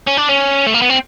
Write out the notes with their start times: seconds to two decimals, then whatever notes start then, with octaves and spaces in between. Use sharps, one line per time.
0.07 C#4
0.17 D4
0.29 C#4
0.66 A3
0.74 A#3
0.82 B3
0.90 C4